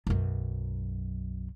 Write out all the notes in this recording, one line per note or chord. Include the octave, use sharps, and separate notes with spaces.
B1 F#2